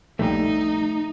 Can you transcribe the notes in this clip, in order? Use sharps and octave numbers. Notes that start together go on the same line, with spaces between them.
A#1 D#2 G3 A3 D#4